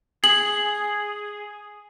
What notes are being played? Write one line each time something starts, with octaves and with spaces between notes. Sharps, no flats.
G#4 F#7